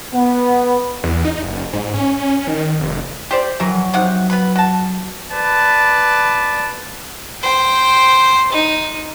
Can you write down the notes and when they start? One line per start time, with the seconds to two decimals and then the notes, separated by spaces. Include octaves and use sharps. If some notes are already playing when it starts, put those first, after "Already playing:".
0.14 B3
1.03 E2
1.25 D#4
1.42 F#1
1.73 G#2
1.94 C#4
2.47 D#3
2.79 F1
3.31 G4 C5 D5
3.60 E3 F#3 A#4
3.94 C3 D#4 F#5
4.30 B3 B4
4.56 F#4 A5
5.31 B4 D5 A5
7.43 C5 G5
8.52 D#4